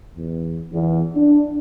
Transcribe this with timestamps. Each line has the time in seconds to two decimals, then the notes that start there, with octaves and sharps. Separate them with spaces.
0.16 E2
0.73 E2
1.15 D4